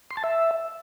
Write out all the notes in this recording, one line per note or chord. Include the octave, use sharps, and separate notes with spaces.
C6
A5
E5